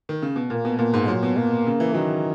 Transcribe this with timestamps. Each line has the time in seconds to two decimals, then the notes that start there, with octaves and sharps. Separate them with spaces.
0.09 D#3
0.22 C#3
0.36 B2
0.50 A#2 A#3
0.65 B2
0.79 A#2 A#3
0.94 G#2
1.08 A#2 F#3
1.23 B2
1.37 A#3
1.67 C#3
1.80 E3
1.94 D#3 F#3